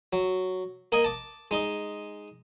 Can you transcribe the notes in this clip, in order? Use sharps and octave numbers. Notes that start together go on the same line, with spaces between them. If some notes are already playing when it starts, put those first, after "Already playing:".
F#3
A#3 A#4 D#5 G#5
A5 D6
G#3 D#4 D#5